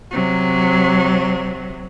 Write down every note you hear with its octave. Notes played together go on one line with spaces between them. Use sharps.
C3 F#3